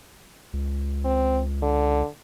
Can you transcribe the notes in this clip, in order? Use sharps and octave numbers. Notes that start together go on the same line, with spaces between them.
C#2
C4
D3